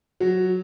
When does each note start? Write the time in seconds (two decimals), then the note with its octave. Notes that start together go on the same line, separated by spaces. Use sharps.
0.20 F#3